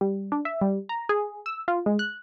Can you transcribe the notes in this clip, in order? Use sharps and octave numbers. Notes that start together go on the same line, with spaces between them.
G3
D4
E5
G3
A#5
G#4
E6
F4
G#3
F#6